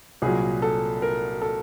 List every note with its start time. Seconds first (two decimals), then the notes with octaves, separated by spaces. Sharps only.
0.22 C2 A#2 F#3 G#4
0.62 A4
1.02 A#4
1.42 A4